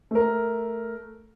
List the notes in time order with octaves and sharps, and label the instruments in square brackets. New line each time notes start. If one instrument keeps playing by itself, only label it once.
[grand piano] A3 A#4